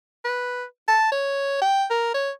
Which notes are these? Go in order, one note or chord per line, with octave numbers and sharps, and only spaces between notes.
B4
A5
C#5
G5
A#4
C#5